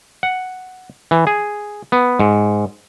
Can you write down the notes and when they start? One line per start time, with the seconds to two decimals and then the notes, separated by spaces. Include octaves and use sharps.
0.23 F#5
1.11 E3
1.27 G#4
1.92 B3
2.20 G#2